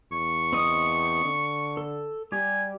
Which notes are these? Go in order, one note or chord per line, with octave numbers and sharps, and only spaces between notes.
E2 C#6
C4 D#5 D#6
D3
A4
G3 G4 G#5